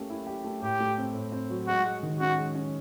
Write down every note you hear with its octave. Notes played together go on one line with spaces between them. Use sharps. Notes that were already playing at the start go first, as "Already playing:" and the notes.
Already playing: A3 A#3 C#4 G4
E4
G4
A3
A2 G4
A3
C4
A2
C4
F#3
G#3 F#4
G#3
D#3
C#4 F#4
G#3
C#4